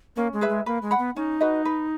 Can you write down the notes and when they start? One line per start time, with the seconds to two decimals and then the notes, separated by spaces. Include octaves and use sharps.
0.16 A#3 C#4
0.33 G#3
0.41 G#4 B4 E5
0.49 G#3
0.66 A#3 B4
0.82 G#3
0.91 F#5 B5
0.99 B3
1.16 C#4 D#4
1.41 F#4 B4 D#5
1.65 B4